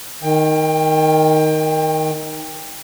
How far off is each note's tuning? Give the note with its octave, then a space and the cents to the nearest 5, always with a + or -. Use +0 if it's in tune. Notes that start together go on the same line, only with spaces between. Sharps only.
D#3 +0 G5 +25